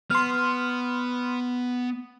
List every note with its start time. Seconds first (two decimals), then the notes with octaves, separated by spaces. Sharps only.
0.10 B3 C6 F6